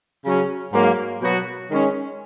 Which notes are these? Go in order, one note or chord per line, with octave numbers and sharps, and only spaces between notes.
C#3 F#3 C#4
G#2 F#3 A#3
B2 F#3 B3 F#4
D#3 G#3 C#4